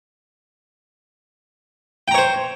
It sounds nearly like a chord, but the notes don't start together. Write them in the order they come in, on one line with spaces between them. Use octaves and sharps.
G5 A#5 C#5 C5